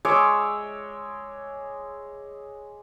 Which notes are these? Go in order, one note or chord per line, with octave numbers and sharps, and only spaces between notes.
G#3 C#5 E5 D6